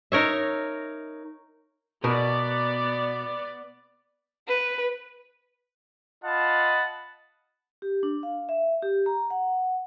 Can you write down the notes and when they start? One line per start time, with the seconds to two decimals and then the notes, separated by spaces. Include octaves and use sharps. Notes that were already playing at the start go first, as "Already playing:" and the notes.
0.12 D#4 A#4 C#5 E5
2.04 B2 B3 A#4 D5
4.48 B4
6.25 F4 D#5 F#5 A5 B5
7.82 G4
8.03 D4
8.23 F5
8.49 E5
8.82 G4
9.06 A#5
9.30 F#5